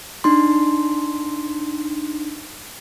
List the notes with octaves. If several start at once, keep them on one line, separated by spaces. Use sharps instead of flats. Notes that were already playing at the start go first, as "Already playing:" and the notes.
D4 D#4 C6